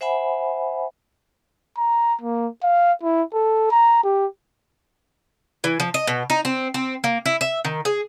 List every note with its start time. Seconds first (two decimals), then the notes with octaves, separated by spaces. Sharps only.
0.01 C5 E5 F#5 G#5 B5
1.77 A#5
2.21 A#3
2.63 F5
3.03 E4
3.33 A4
3.71 A#5
4.04 G4
5.64 E3
5.80 F3
5.94 D#5
6.07 B2
6.30 D#4
6.45 C4
6.74 C4
7.04 A#3
7.26 E4
7.41 E5
7.65 D#3
7.85 G#4